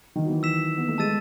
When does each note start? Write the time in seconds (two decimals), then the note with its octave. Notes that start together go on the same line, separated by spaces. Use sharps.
0.16 D#3
0.24 F#3
0.29 E3
0.43 E6 B6 E7
0.77 B3
0.88 A3
0.98 G#3 A5 E6 A6 D#7